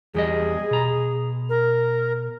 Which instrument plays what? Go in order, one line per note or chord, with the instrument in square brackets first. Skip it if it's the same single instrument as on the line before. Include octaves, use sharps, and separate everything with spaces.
[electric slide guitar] E2 G3 D#5 [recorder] G#4
[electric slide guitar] B2 A#5
[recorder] A#4